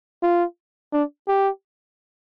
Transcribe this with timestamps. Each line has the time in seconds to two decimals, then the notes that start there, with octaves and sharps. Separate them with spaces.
0.23 F4
0.93 D4
1.28 G4